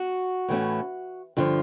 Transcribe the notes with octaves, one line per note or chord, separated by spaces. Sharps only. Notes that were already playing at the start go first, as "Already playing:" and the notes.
Already playing: F#4
A2 E3 A3 C#4
G2 D3 F3 F4